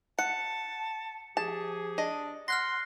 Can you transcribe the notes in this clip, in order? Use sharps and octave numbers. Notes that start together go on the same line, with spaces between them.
F#5 A5 C#7
F3 G4 G#4 A5
D4 D#5
F#5 C6 F6 F#6 A#6